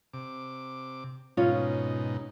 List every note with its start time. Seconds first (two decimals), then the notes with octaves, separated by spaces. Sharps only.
0.14 C3 D6
1.37 G#2 B2 C#4 D#4 F4 C#5